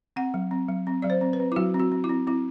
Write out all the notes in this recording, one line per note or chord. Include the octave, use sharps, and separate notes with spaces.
C4 F#5
F#3
C4
F#3
C4
F#3 D5
C5
C4
B4
C4
E4
F#3 F#4
C4
F#4
C4
E4
C4
C4 E4